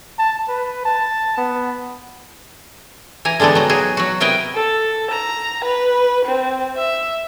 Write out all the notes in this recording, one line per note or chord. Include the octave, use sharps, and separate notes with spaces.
A5
B4
A5
B3
E3 G#5 A#5
D3 G3 G#3 B3 A4
F#3 D#4
F#3 F#4 G#4
F#3 F#4
C3 B3 E4 A#4 D#5 G5
A4
A#5
B4
C4
E5